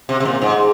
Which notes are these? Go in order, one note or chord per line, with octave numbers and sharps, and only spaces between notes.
C3
C3
A#2
G#2